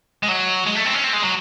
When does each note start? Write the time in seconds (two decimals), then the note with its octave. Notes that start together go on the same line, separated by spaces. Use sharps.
0.23 G#3
0.28 F#3
0.67 G#3
0.76 A3
0.85 C4
0.95 C#4
1.04 C4
1.14 G#3
1.23 F#3